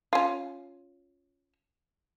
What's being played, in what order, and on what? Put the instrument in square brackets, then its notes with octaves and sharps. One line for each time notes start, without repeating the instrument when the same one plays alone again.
[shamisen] C#4 F4